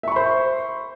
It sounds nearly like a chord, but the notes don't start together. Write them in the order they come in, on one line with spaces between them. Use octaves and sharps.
E5 C#6 B5 C5